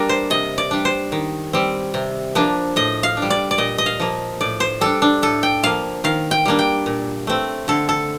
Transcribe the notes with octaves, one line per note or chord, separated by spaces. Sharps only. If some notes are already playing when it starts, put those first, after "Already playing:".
Already playing: G3 A#3 D4 G4 A#4
C5
C3 D#5
D5
G3 D4
C5
D#3
G3 C4
C3
F3 A#3 D4
A2 D#5
F5
D4
G3
D5
D5
A#2 D#5
D#5
F5
F3 A#3
A2 D5
C5
G3 D4 A4
D4
A2 A4
G5
F3 A#3 F5
D#3 F5
G5
G3 A#3 D4
G5
A#2
A3 C4
D3 A4
A4